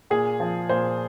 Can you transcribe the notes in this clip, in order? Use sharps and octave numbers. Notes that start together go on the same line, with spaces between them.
A#2 G#4
F3
A#2 C5